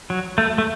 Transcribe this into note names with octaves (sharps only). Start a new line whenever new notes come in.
F#3
A3
A3